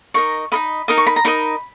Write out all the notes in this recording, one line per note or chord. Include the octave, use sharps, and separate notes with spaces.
D#4 A#4 D#5 C#6
D#4 A#4 D#5 B5
D#4 A#4 D#5 A#5
C#6
B5
A#5
D#4 A#4 D#5 B5